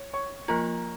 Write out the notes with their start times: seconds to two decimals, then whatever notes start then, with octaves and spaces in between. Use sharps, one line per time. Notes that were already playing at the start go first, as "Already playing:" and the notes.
Already playing: C#5
0.13 C#5 C#6
0.48 F3 A#3 F4 A#4 A#5